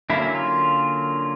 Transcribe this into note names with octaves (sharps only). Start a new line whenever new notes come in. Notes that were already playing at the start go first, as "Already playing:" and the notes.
D3 F#3 A#3 C#4 E4
F4